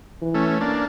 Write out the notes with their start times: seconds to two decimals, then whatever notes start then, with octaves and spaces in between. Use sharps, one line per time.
0.22 E3
0.34 A3 C#4
0.61 A#3 D4